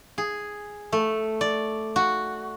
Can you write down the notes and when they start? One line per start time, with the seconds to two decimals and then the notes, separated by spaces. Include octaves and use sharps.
0.18 G#4
0.93 A3
1.41 D5
1.96 F#4